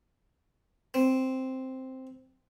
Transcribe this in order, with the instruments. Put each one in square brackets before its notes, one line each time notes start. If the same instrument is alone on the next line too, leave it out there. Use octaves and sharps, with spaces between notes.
[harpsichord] C4